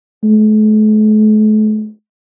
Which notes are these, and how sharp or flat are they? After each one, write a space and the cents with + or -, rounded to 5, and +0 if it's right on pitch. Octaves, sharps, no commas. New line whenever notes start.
A3 -45